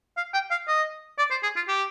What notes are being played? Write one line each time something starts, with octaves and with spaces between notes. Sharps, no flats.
F5
G5
F5
D#5
D5
C5
G#4
F4
G4